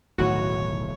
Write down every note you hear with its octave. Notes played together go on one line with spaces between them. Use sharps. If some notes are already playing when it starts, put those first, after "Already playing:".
D1 B1 A2 D#3 E3 A3 F#4 C#5